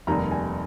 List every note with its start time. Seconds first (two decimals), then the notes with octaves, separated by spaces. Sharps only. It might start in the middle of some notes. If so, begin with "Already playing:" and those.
0.07 F1 D#2 D#3 G3 A#5
0.31 G#5